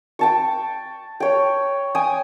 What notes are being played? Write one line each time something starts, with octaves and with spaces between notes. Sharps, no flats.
G5 A5 C#6
C#5 G5
G5 G#5 D#6